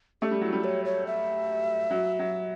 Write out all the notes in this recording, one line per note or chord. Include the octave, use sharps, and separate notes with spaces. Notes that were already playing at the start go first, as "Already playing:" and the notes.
A3 G4
G3
F#3 E4
G3
C#5
C#5
E5
F#3
F#3